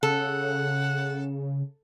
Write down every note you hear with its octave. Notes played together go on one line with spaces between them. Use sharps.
C#3 A4 F#5